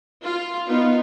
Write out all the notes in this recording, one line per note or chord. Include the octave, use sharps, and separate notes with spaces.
F4
B3 D#4 F4